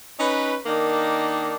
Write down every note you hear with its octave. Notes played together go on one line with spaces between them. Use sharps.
C#4 D#4 B4
D#3 A#3 D4 D#4